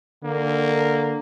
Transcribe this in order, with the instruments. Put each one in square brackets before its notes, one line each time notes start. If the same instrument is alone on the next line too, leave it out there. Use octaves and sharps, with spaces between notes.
[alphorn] D3 [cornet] A#3